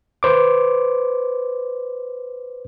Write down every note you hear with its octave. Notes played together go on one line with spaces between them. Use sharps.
B4 C5 D6